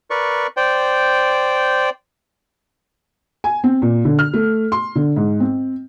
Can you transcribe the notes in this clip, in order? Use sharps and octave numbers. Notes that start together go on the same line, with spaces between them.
A#4 B4 D5 C#6
C5 D5 G5
G#5
C4
A#2
D3
F6
A3
C6
D3
G#2
C4